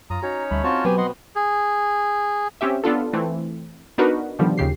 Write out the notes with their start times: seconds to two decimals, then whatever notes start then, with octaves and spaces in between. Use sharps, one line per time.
0.10 F#2 F4 A#5 D#6
0.23 C#4 D#4 F#4 C#5
0.51 D2 G3 A3 B5
0.64 C4 F4 F#4 A5
0.85 B2 F#3 B3 C4 G4 G#5
0.98 D#5 F#5 C6
1.36 G#4
2.61 C4 C#4 G4 E5
2.84 B3 D4 F4 A4
3.13 E3 A3 C4
3.98 B3 D4 D#4 F#4 A#4 B4
4.39 B2 D3 D#3 F3 G3
4.58 D#2 C#3 G4 C7